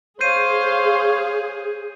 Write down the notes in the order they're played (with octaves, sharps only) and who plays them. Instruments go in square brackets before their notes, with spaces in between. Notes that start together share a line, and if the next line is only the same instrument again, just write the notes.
[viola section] G#4 [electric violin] C5 F5 [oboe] C#5 [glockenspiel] G6 C7 D#7